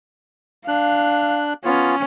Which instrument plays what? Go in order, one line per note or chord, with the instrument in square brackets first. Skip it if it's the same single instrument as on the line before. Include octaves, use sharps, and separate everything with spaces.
[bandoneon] D4 F#6 [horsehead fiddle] F5
[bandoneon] B3 F4 [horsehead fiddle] C#4